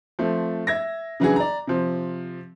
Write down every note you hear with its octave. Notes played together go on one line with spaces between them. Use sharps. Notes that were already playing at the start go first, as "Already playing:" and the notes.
F3 A3 C4
E5 G#6 A#6
C#3 E3 F#3 D4 F#4 G#4
D5 A#5
C3 F3 C4